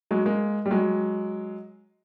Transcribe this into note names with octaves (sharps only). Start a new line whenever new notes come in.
F#3 G#3
G#3 A#3
G3
F#3 G#3